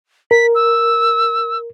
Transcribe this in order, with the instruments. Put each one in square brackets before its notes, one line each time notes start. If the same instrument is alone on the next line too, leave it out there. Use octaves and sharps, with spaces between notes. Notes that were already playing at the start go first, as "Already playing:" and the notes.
[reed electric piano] A#4 [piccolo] B6
[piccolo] E6